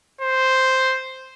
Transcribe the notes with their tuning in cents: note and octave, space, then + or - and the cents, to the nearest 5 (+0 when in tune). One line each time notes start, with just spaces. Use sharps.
C5 +0